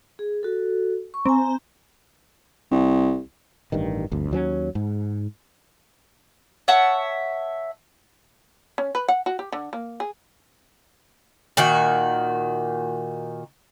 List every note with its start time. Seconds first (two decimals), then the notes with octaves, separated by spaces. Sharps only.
0.19 G#4
0.43 F#4 A4
1.14 C#6
1.26 C4 G#5 A#5
2.71 C2
3.72 A1 G2 D#3
4.12 G1 D2
4.31 D#2 F#3 B3 C#4
4.75 G#2
6.68 C#5 E5 F#5 A5
8.78 C#4
8.95 B4
9.08 F#5
9.26 F#4
9.39 G4
9.52 D3
9.73 A#3
10.00 G#4
11.57 A#2 D#3 F#4